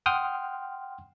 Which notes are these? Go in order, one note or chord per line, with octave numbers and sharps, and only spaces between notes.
F#5 G5 C6 D#6 F6